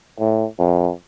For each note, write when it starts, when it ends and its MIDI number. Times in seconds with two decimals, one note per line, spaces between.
0.20 0.46 45
0.59 0.92 41